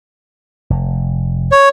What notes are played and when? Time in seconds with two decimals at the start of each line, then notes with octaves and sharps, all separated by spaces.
0.70 F1
1.52 C#5